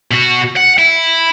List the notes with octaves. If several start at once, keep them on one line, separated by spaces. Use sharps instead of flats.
B2 F#4
F#5
E4